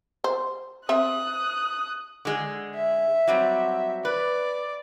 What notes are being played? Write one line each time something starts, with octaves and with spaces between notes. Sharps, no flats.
C5
C4 E5 D#6 F#6
D3 G#3
E5
F#3 G3 C4
B4 D5